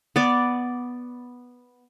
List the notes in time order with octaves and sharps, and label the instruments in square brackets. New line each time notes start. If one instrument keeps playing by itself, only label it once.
[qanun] B3 D5